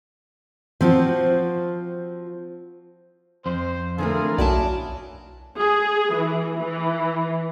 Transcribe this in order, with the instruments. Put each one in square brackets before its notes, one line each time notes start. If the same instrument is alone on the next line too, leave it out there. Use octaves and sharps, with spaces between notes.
[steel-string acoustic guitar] F3 C4 F4 F#4
[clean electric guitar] F2 [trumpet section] C5
[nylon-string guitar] D3 E3 A3 [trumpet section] F4 G#4 A#4
[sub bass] B1 [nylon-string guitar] C#4 E4 F#4 [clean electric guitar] D5 A5
[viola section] G#4
E3
E3